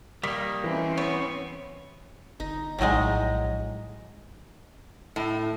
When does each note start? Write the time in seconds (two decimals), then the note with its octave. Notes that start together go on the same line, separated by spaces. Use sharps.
0.24 D#3 G3 A#3 B6
0.64 E3 C4 C#4
0.98 B3 C#5
2.40 G1 D#4
2.79 A#1 A2 F#3 G#3 D#4 D#5
5.16 A2